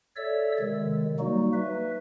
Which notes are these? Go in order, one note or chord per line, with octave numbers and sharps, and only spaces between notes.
A4 C#5 D5 E5 E6
C3 D#3 G#3
F#3 G3 A#3 D#4 F#4
B4 E5